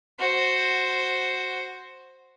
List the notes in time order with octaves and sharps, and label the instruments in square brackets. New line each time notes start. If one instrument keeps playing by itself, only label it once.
[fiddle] F#4 C5